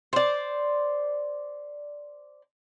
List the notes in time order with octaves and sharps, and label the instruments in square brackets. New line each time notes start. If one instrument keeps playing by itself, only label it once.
[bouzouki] C5 D5